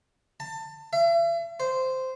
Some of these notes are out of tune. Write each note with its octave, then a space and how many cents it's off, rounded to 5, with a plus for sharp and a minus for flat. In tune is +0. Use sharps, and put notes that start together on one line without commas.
A5 +25
E5 +40
C5 -10